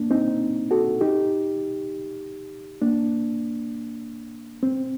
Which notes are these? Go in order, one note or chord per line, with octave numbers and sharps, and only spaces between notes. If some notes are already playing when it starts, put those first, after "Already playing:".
Already playing: A#3 D4
C4 D#4
F#4 A4
D#4 G4
A#3 D4
C4